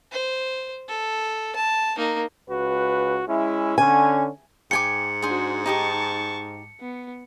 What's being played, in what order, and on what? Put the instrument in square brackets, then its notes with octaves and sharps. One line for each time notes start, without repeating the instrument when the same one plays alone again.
[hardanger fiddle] C5
A4
A5
A#3 D#4
[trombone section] C#2 F#4 B4
G#3 C#4 E4
[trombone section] D3 C#4 [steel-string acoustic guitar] G#5
[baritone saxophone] G#2 [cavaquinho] G5 G#5 D6 [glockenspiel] C#7
[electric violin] D4 F#4 [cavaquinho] G#4 C5
[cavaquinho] D#4 G4 D#6 [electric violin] A5 C#6
[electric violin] B3